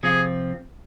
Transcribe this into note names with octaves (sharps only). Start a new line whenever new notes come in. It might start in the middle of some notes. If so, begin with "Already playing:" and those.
C3 F3 C4 F4 G#4